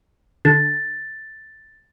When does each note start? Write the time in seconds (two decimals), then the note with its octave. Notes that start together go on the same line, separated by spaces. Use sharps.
0.45 D3 A6